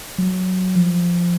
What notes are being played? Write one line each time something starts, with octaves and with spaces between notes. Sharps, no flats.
F#3
F3